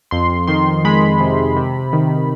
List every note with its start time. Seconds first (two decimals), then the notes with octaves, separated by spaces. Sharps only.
0.11 F2 C6
0.47 D#3 C6
0.85 G#3 B5
1.20 C3
1.57 C3
1.93 D#3